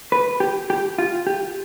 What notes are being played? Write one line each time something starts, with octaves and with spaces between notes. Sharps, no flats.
B4
G4
G4
F4
G4